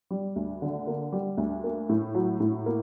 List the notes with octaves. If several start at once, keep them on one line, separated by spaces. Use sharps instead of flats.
G3
D2
D3
A#3
G3
D2
A#3
A2
F#3
A2
A#3